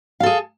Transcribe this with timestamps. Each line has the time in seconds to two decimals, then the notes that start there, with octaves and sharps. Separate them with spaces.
0.20 F5
0.23 A4
0.26 G#4